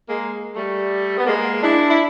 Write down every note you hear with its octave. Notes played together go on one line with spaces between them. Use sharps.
G#3 A#3
G3 A3
B3
G#3 A#3
D4 E4
E4